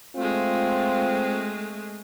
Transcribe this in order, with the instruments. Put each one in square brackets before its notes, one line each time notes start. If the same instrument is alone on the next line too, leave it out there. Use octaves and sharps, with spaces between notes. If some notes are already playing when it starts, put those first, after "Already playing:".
[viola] G#3 A3 [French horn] C4 [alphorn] F4